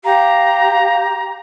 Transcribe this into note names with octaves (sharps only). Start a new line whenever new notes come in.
G4 F5 A#5